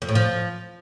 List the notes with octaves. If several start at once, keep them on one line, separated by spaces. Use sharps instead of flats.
F2
A2
F3